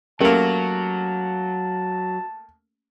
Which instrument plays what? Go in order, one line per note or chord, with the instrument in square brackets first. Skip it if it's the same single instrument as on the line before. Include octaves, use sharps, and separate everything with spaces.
[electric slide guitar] F#3 [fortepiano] A3 A#3 [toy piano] C#4 G4 A#4 [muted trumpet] A5